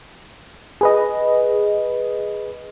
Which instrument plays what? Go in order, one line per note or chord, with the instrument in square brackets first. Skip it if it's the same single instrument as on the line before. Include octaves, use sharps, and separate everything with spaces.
[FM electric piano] G#4 B4 D#5